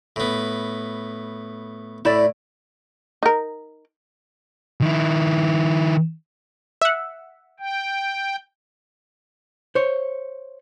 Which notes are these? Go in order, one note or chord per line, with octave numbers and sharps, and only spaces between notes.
A2 B3
A2 E4 D5
D#4 A#4
D#3 E4
E5 F#5
G5
C5 C#5